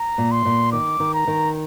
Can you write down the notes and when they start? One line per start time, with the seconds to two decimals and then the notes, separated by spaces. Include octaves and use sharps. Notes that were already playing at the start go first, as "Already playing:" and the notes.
Already playing: A#5
0.18 A#2
0.31 C6
0.45 A#2
0.72 D#3 D6
1.00 D#3
1.14 A#5
1.27 D#3